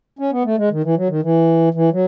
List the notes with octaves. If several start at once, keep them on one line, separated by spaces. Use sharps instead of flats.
C#4
B3
A3
G#3
D#3
E3
F#3
D#3
E3
E3
F#3